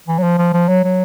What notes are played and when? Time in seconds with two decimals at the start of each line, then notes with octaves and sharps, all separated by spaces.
0.08 E3
0.18 F#3
0.23 F3
0.38 F3
0.53 F3
0.68 F#3
0.84 F#3